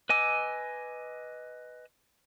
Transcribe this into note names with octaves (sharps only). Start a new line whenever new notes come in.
B4 D#5 G#5 D6 E6